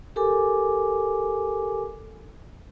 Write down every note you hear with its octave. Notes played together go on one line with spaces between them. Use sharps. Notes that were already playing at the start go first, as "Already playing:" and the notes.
G4 A4 A#4 G#5 D6